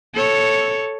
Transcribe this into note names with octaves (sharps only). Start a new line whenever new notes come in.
A4 C#5